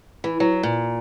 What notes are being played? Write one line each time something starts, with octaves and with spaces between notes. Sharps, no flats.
E3
F#3
A#2